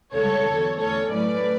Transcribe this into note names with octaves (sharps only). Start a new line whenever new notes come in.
C#2 C#3 G3 A4 C#5
E2 D3 F#3
E2 D3 A3 C#4 A4 C#5
A2 F#3 A3 C#4 B4 D5